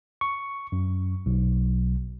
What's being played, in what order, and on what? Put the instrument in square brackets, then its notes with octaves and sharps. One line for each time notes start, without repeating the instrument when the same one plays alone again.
[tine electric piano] C#6
F#2
B1